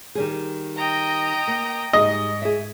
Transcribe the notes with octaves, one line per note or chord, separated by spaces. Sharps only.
D#3 G3 G#4
D#5 G5 A#5
A#3
G#2 G3 D#4 G#4 D#5
G#4 E5